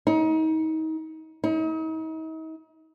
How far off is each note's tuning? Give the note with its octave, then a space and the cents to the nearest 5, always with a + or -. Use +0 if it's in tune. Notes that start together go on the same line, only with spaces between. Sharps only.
D#4 +30
D#4 +40